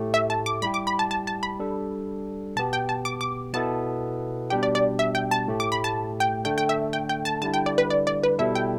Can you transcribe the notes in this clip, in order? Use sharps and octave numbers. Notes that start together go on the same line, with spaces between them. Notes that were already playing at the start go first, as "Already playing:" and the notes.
Already playing: A2 A3 G4
E5
A5
D6
G3 E4 G4 B5
D6
B5
A5
A5
A5
B5
G3 D4 A4
B2 B3 G4 A5
G5
A5
D6
D6
B2 B3 E4 A4 A5
B2 G3 D4 G4 G5
D5
D5
E5
G5
A5
A2 A3 G4
D6
B5
A5
G5
D3 A3 D4 A4 G5
G5
E5
G5
G5
A5
D3 G3 E4 A5
G5
D5
B4
D5
D5
B4
B2 G3 E4 A4 E5
G5